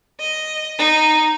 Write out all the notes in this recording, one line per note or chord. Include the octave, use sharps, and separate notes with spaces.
D#5
D#4